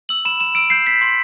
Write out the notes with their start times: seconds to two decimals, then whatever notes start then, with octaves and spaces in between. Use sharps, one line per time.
0.09 E6 F#7
0.25 B5 E7
0.40 B5 E7
0.55 E6 D7
0.70 G6 C7
0.86 G6 B6
1.01 C6